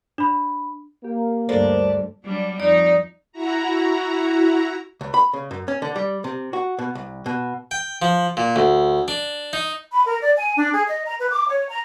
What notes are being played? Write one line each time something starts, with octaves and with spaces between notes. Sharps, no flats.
D4 B5
A#3 G4
D2 G2 D4 A4 A#4 C5
F#3 G3 D4
F2 D#4 D5
E4 F#4 A#5
C#2
B5
C#3
F#2
C#4
D3
G3
C3
F#4
B2
C2
B2
G5
F3
A#2
D2
D4
D#4
B5
A#4
D5
G#5
D4
G#4
D#5
A#5
B4
D6
C#5
A#5